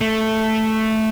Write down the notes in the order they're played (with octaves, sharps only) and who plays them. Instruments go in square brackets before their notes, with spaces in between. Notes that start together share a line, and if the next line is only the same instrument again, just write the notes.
[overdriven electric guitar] A3